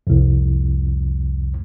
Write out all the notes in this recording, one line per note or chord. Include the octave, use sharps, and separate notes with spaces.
C2 F2